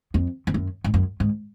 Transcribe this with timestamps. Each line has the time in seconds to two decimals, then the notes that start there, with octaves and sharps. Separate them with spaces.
0.14 F2
0.47 F2
0.54 F#2
0.84 G#2
0.94 F#2
1.20 G#2